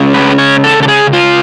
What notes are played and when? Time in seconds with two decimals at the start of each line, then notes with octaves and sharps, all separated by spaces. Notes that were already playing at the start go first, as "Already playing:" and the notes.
Already playing: C#3 G#3 C#4
0.14 B4
0.38 C#5
0.64 A4
0.83 A4
0.88 G#4
1.13 F4